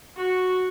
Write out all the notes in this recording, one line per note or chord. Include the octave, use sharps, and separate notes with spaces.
F#4